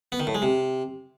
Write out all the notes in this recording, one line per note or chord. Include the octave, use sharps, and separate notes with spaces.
B3
D#3
A2
G#3
C3